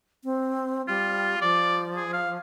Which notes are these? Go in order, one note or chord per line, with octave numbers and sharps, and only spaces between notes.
C4
G3 F4
F3 D5
G#4
F5